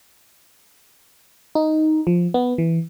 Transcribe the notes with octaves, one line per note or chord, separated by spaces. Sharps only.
D#4
F3
B3
E3